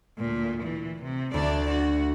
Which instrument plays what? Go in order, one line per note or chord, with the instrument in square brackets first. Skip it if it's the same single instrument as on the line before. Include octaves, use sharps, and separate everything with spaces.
[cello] D2 A#2
E3
C3
[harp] D2 [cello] D4 D5
[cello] F#4